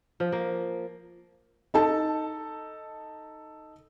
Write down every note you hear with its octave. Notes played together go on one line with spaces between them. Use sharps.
F3
A#3
D#4 A4 A5